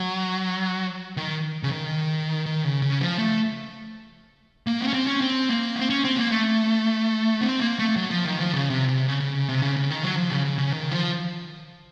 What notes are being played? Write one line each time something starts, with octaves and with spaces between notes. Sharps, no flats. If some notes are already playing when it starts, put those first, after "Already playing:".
Already playing: F#3
D#3
C#3
D#3
D#3
C#3
C#3
F3
A3
A#3
C4
C#4
C4
C#4
C4
A#3
C4
C#4
C4
A#3
A3
C4
A#3
A3
F#3
F3
D#3
F3
C#3
C3
C3
C#3
C#3
C#3
C3
C#3
C#3
D#3
F#3
F3
C#3
C#3
C#3
D#3
F3